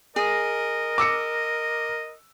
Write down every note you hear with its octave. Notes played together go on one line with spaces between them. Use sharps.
G#4 A#4 D#5
D6 E6 C#7